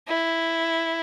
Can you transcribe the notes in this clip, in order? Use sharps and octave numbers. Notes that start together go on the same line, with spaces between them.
E4